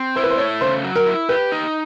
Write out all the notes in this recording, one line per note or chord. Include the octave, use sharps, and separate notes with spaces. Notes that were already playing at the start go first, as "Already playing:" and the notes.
Already playing: C4
E4 C5
B4
C5
A3 C#5
C#3 C5
F#3
A#4
E4
G4 B4
D#4